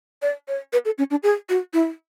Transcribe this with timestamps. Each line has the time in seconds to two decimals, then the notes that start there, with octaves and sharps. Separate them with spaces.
0.22 D5
0.48 C#5
0.73 B4
0.85 A4
0.98 C#4
1.11 D4
1.23 G#4
1.49 F#4
1.73 E4